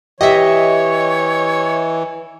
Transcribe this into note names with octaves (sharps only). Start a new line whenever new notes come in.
E3 G4 C#5 D#5 E5